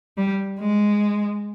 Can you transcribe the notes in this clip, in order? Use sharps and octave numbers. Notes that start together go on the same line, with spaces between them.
G3
G#3